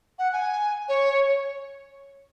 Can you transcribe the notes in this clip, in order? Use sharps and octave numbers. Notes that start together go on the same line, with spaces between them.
F#5
G#5
C#5